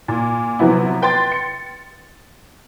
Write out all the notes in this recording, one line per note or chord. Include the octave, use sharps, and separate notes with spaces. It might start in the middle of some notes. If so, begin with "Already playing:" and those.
A#2
C3 F3 F#3 B3 E4
B4 G5 C6 A6
C#7